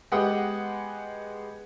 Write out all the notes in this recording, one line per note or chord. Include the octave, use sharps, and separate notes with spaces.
G#3 B3 G4 F#5 D#6